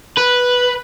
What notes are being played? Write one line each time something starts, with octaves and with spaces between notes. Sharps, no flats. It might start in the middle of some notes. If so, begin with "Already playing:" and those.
B4